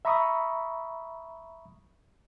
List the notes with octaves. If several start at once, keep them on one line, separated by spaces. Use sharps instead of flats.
E5 A#5 B5 C#6 D#6